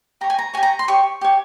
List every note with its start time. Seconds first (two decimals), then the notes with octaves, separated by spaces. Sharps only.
0.21 G4 C#5 A#5
0.30 G#5
0.39 A#5
0.54 G4 C#5 G#5
0.63 A#5
0.79 C6
0.88 G4 C#5 C#6
1.21 G4 C#5